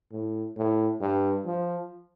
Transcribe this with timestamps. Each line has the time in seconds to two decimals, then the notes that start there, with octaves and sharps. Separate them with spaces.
0.12 A2
0.56 A2
1.01 G2
1.45 F3